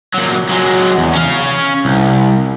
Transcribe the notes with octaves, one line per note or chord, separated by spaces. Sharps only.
A#2 F#3
F#3 G#3
E2
C#4 F5
C2